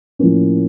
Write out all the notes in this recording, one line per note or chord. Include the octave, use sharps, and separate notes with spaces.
A2 F3 A#3 C#4